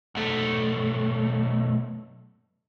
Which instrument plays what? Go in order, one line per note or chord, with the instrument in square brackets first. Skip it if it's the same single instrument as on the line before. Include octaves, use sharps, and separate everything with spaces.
[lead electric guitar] B1 A3